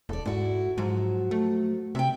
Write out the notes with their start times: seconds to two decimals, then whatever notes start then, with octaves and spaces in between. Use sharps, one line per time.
0.09 E1 A4 D5
0.25 G#2 E4 F#4
0.78 G#2 F3 F#3
1.31 A3
1.95 C3 E5 G5